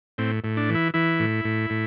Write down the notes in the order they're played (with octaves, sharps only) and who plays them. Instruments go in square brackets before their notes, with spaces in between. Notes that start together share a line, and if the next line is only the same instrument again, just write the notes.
[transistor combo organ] A2 C4
A2
D4
E3
E4
E3 E4
A2
A2
A2